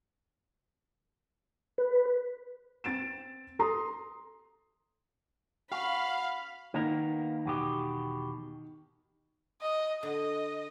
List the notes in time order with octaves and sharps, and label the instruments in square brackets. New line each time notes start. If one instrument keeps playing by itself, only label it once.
[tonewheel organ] B4
[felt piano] C4 A6 D7 E7
A4 A#5 C6 D#6
[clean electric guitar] F#4 [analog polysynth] F5 [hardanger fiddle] B5
[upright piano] D#3 [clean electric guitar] A#3 B3 A#4
[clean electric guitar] E2 B2 G4
[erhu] D#5
[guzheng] D3 [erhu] D#5